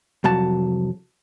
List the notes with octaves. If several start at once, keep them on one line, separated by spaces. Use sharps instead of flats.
C2 F2 F#3 A5